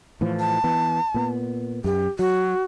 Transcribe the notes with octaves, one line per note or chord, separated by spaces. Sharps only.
A2 E3 F3
A5
E3 B3
A#2 B3
F#2 G4
F#3 F#4